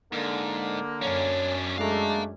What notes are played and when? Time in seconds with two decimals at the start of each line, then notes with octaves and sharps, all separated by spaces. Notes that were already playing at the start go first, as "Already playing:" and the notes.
0.13 G#2 D3 A#3
1.02 F#2 C#4 D4 C#5
1.78 G#3 A3 D4 F5 A#5